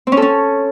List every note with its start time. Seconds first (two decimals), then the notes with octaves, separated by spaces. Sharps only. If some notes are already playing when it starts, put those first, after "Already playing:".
0.07 C4
0.12 C#4
0.17 A4
0.22 C#4